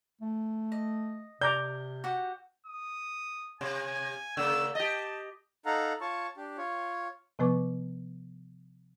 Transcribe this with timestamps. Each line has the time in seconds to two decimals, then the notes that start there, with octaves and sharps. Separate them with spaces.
0.21 A3
0.72 D#5
1.41 C3 D5 A#5 D6 G6
2.04 F#4 G4 F#5
2.66 D#6
3.61 C3 G#5
4.37 C#3 A#3 E6
4.75 G4 D#5 A5
5.65 D#4 A4 F5 F#5 A#5
6.01 F4 C#5 A5 C#6
6.37 D4 G4
6.57 F4 C#5
7.39 C3 F3 B3 B4 C#6 D6